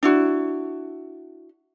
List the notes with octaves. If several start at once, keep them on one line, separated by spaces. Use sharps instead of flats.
D4 E4 F#4